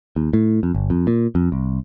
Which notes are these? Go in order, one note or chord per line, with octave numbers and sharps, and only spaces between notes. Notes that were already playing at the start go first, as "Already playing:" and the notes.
D#2
A2
F2
G1
F2
A#2
F2
C2